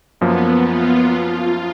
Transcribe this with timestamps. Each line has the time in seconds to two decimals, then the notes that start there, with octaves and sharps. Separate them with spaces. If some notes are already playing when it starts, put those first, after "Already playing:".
0.21 F#2 F3 A#3 B3
0.66 F4
1.12 F4